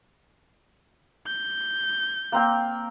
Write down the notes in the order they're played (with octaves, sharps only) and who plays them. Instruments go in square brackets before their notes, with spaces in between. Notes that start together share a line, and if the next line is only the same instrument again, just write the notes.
[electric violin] G6
[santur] A#3 C4 G5